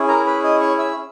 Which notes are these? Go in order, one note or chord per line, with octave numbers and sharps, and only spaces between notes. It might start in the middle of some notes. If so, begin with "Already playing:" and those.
Already playing: C#4 E4 G#4
A#4 A#5
B4 B5
D#5 D#6
C#5 C#6
E5 E6